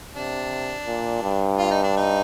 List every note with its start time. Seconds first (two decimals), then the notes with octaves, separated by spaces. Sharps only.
0.15 C3 D4
0.87 A#2
1.22 G2
1.58 F4
1.71 D#4
1.83 D4
1.97 D#4